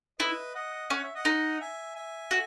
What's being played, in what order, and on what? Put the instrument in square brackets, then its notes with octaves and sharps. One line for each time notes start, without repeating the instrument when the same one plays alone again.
[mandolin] E4 [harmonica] B4 D#5
[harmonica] D#5 F#5
[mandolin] C#4 [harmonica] F#5
[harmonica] E5
D#5 F#5
[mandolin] D#4
[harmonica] E5 G#5
E5 G#5
[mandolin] F#4